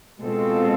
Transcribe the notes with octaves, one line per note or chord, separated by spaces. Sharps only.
B2 G#3 C4 F4 A4